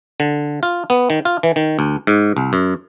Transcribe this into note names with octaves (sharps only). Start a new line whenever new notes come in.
D3
F4
B3
D#3
F4
E3
D#3
D2
G#2
C2
F#2